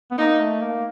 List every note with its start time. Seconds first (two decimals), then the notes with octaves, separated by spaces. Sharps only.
0.11 B3
0.18 A#3 D#4
0.40 A3
0.61 A#3